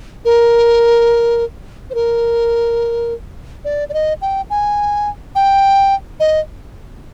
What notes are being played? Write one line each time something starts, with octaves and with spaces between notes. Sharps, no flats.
A#4
C5
A#4
D5
D5
D#5
G5
G#5
G5
D#5